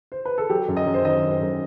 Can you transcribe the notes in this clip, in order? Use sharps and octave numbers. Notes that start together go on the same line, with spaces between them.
C5
B4
A4
F#3 G4
F#2
D#5
F#2
C5
D#3 D#5
F#3
C5
F#2